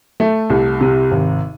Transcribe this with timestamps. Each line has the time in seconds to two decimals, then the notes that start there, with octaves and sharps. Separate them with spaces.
0.20 A3
0.50 C2
0.81 C3
1.11 G#1